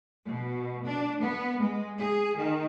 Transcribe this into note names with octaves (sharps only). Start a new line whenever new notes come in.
B2
D4
B3
G#3
G#4
D#3